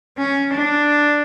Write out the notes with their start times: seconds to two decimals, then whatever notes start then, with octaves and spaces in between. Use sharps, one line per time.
0.18 C#4
0.53 D4